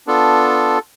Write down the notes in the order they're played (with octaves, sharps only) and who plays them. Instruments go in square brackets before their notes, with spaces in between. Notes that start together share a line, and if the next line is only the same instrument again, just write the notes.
[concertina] B3 D4 F4 A4